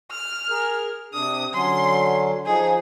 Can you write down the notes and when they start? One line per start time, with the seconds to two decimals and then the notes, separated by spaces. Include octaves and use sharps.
0.11 F6
0.50 G#4 A#4
1.14 C3 D4 D#6
1.54 D3 F#3 C#4 C6
2.46 F3 D#4 G#4